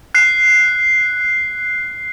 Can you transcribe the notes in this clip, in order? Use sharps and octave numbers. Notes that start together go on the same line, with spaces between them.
F#6 C7